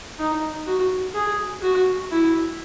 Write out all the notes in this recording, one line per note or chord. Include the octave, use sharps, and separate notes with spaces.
D#4
F#4
G#4
F#4
E4